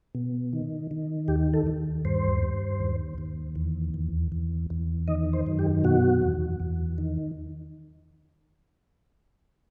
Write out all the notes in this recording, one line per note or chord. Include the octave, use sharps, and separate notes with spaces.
B2
D#3
D#3
D#2 G4
A4
D#2
G2 C5
G2
D#2
D#2
E2
E2
E2
E2
D#3 D#5
C5
F#2
G4
B2 F#4
E2
E2
D#3